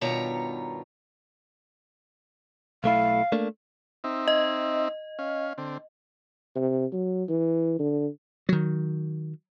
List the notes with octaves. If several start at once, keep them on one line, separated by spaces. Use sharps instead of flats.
G2 B2 D#3 F4 C#5 A#5
B1 A3 E4 F5
A3 A#3 D4
C4 D#4 E5
D#5
C#4 F5
D3 C4
C3
F#3
E3
D3
D#3 F#3